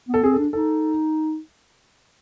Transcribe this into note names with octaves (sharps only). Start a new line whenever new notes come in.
B3
A4
C4 G#4
A4
D4
D#4 A4